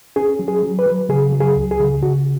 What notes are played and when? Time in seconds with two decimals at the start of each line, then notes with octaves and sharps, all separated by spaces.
0.16 C#4 G#4
0.39 F#3
0.48 G#4
0.63 F#3
0.79 B4
0.86 F#3
1.09 C#3 G#4
1.33 F#3
1.40 G#4
1.56 C#2
1.71 G#4
1.80 C#3
2.02 C#3 F#4